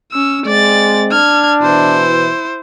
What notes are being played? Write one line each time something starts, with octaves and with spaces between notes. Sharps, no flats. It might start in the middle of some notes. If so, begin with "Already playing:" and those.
C#4 E6
G#3 C4 D5 A6
D4 F6 G#6
B2 E3 E4 C5